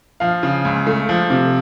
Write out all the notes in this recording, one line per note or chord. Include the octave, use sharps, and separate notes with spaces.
F3 F5
C#3
C#2
A3
F3
C3